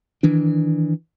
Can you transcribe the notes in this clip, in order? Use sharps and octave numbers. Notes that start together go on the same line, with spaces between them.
D#3 E3 D4